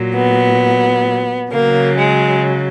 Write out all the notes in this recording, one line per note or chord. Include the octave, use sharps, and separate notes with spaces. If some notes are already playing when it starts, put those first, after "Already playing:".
Already playing: A#2 F#3
B3
C#3 F#3 A#3
G#3